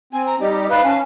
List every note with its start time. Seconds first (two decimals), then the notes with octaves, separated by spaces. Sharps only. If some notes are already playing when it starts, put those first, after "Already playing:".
0.13 C4 G#5
0.27 A#5
0.41 G3 D#4 G4 D5 D#5
0.70 G#2 B4 D#5 F5 B5
0.84 C#4 G#5 A5